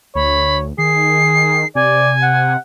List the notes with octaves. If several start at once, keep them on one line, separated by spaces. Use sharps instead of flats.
D2 C#5 B5
D#3 G#4 C7
C3 D5 G#5
F#5